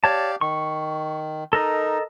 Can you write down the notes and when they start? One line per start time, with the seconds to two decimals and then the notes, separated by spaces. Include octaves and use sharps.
0.04 G4 C#5 D5 F5 A5
0.41 D#3 C#6
1.53 D#4 A4 A#4 D#5